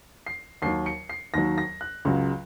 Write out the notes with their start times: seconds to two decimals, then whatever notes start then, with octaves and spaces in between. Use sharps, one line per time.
0.26 C7
0.62 D#2 D#3 F#3 C7
0.86 C#7
1.09 C7
1.34 D#2 D#3 F#3 A#6
1.58 A#6
1.81 F#6
2.05 C#2 C#3 F#3